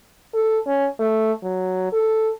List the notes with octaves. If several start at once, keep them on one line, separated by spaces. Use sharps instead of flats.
A4
C#4
A3
F#3
A4